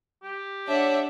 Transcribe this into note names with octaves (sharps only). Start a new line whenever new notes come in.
G4
D4 C#5 E5 F#5